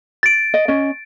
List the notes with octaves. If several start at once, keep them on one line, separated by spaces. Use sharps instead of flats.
A6 D7
D#5
C#4 D#5